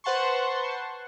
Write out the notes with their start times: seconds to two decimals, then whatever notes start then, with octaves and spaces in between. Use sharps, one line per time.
0.04 B4 C5 F#5 A5 C6 C#6